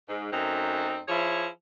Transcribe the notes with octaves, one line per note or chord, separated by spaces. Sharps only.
G#2
F#2 A3 C4 D#4
F3 E4 G#4 C#5